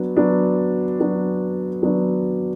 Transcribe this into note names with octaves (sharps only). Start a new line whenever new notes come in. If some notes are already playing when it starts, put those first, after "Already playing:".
Already playing: F#3 B3 D4
F#3 B3 D4
F#3 B3 D4
F#3 B3 D4